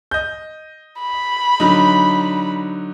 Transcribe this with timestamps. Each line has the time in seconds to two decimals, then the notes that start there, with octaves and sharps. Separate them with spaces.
0.11 D#5 G6
1.01 B5
1.60 D3 F#3 D#4